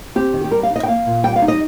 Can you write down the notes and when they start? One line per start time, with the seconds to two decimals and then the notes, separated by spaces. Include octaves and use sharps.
0.15 C4 G4
0.33 D#3
0.44 G4
0.51 G3 A#4
0.63 F5
0.70 D#4
0.76 D#5
0.83 G5
0.88 A#3 F5
1.06 A#2
1.23 G3 G5
1.36 F5
1.42 D#4
1.48 D#5